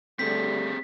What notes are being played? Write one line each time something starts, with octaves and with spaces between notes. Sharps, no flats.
D3 G3 A3 C4 G4 G#4 B6